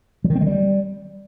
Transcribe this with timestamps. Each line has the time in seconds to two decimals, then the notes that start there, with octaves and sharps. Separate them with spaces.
0.24 F#3
0.30 D#3
0.35 C4
0.41 G#3
0.47 G3